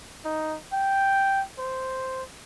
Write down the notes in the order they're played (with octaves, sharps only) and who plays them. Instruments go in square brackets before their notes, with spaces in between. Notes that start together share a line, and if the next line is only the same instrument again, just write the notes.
[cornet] D#4
G5
C5